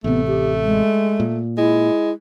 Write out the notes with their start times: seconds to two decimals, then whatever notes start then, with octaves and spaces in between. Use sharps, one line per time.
0.04 A1 C3 A3 B3
0.28 G4
0.64 G#3
1.20 A#2
1.58 G#3 E4